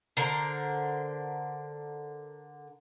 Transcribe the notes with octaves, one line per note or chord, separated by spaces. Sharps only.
D3 A#4 C5